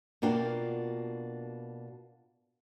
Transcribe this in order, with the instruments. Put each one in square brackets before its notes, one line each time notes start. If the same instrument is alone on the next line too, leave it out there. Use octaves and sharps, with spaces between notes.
[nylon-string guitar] B2 A#3 D4 F4 F#5 G5